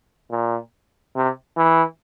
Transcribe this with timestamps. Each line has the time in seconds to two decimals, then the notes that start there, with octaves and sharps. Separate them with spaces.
0.31 A#2
1.16 C3
1.57 E3